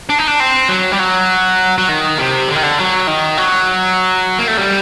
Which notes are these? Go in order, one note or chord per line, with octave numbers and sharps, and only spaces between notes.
D4
D#4
D4
C4
F#3
G3
F#3
F#3
D#3
C3
D3
D#3
D3
F#3
D#3
F#3
A#3
A3
G3